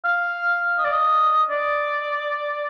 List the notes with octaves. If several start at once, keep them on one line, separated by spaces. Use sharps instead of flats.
F5
D#5
D5
D#5
D5